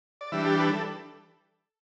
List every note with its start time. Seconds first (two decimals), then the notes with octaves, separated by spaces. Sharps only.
0.21 D5
0.32 E3 G3 D4 E5
0.46 G4
0.60 B4
0.73 A4